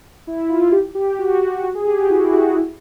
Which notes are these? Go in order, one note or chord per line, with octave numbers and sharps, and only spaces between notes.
E4
F4
G4
G4
F#4
F#4
F#4
G#4
G4
F#4
E4
F#4
E4